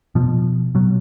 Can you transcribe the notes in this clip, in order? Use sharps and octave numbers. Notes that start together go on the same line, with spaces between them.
B2 F3
B2 F#3